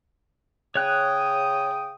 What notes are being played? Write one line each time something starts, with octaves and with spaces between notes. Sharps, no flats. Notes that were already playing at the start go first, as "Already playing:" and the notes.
C#3 C#5 G5 D#6 F#6